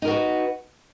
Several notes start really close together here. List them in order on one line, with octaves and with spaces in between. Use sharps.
D#4 A#4 F#4 B4